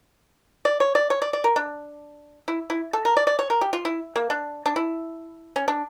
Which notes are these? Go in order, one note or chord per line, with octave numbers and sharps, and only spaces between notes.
D5
C#5
D5
C#5
D5
D5
A#4
D4
E4
E4
A4
A#4
D5
D5
C#5
A#4
G4
F4
E4
A#3
D4
D4
E4
C#4
D4